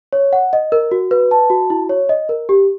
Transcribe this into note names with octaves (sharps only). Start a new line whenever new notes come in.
C#5
F#5
D#5
A#4
F#4
B4
A5
F#4
E4
C#5
D#5
A#4
G4